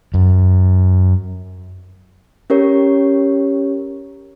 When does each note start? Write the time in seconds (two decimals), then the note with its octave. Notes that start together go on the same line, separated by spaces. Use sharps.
0.14 F#2
2.50 C#4 G4 A#4 C#5